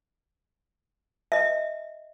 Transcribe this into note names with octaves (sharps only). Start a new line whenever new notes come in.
D#5 E5